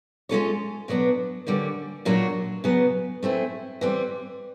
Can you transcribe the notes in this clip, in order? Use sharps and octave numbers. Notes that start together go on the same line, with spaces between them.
G#3 C#4 F4 A4 C#5
B2 F#3 B3 D4
D3 G3 A#3 C#4
A#2 F#3 A#3 D4 F#4
C#3 F#3 B3
A3 C4 E4 G#4
E3 G3 C4